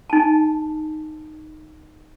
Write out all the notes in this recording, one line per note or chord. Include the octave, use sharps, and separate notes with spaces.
D#4 G#5 A5